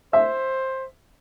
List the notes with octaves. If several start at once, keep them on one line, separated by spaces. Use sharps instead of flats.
C5 E5